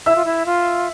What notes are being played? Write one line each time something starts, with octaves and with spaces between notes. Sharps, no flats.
E4 E5 E6
F4
E4
F4